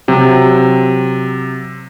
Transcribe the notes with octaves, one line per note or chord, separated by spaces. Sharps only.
C3 F#3